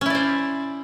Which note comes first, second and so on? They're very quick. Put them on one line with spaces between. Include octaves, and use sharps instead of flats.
C#4 E4 D5 C5